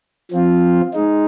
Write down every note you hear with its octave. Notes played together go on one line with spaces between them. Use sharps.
F3 C4 F4
G#3 D#4